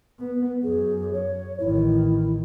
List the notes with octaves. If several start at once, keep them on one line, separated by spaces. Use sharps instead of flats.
B3
F#2 G#4
C#5
A1 D#3 E4